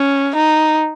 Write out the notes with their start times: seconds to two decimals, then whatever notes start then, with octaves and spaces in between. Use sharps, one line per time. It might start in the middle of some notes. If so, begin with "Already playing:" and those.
Already playing: C#4
0.36 D#4